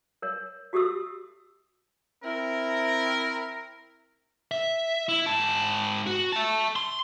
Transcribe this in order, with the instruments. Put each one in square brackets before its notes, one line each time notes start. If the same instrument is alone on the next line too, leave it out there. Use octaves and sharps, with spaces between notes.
[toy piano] A#4 C#5
F#4 G4 A4 D#6 E6
[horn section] C4 E4 A#4
[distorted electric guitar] E5
E4
G#2 A5
F#4
E5 A5
C6